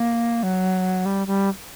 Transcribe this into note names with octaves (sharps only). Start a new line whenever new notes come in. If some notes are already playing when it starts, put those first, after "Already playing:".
Already playing: A#3
F#3
G3
G3